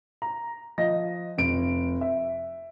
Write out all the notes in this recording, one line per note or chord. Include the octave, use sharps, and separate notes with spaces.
A#5
F3 D#5 A#6
F1 D7
E5